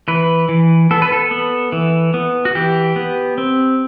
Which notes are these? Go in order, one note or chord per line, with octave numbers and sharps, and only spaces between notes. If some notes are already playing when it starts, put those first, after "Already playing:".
E3 B4
E3
B3 A4
B4
A4
B3
E3
B3
F#4
E3 G4
B3
C4